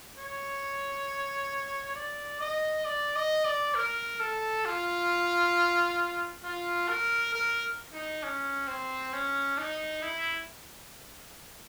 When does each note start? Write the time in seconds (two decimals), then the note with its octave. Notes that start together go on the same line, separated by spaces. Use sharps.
0.17 C#5
1.95 D5
2.41 D#5
2.85 D5
3.16 D#5
3.45 D5
3.75 A#4
4.20 A4
4.65 F4
6.44 F4
6.89 A#4
7.34 A#4
7.93 D#4
8.23 C#4
8.68 C4
9.13 C#4
9.58 D#4
10.02 E4